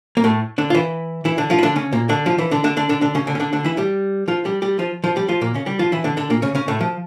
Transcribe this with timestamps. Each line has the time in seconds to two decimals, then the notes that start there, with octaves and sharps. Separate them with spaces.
0.17 A#3
0.24 A2 A3
0.58 D3 D4
0.70 F4
0.75 E3 E4
1.25 E3 E4
1.38 D3 D4
1.50 F3 F4
1.58 E4
1.63 D3 D4
1.76 C#3 C#4
1.92 A#2 A#3
2.09 D3 D4
2.26 F3 F4
2.38 E3 E4
2.51 D3 D4
2.64 D3 D4
2.77 D3 D4
2.89 D3 D4
3.01 D3 D4
3.15 C#3 C#4
3.27 D3 D4
3.35 C#4
3.40 D3 D4
3.53 D3 D4
3.64 E3 E4
3.77 G3 G4
4.28 F3 F4
4.45 G3 G4
4.62 G3 G4
4.79 F3 F4
5.04 F3 F4
5.16 G3 G4
5.29 F3 F4
5.41 A#2 A#3
5.54 C#3 C#4
5.66 G3 G4
5.79 F3 F4
5.92 E3 E4
6.04 D3 D4
6.17 D3 D4
6.30 A#2 A#3
6.42 C#3 C#4
6.55 C#3 C#4
6.68 A2 A3
6.81 F3